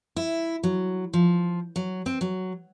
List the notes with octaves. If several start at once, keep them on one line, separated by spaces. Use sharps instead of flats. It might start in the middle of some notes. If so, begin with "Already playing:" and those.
E4
F#3
F3
F#3
C4
F#3